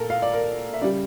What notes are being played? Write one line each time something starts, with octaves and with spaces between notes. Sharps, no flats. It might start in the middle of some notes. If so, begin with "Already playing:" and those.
Already playing: A#2 A4 A#4
F5
D5
A#4
E5
C#3 G3 D5